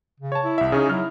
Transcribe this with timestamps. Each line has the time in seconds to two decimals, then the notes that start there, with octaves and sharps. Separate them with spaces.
0.20 C#3
0.32 C#5 A5
0.44 E4
0.58 C2 E5
0.72 C#3 C#4 D#4 G#4
0.89 F#3 E4 F6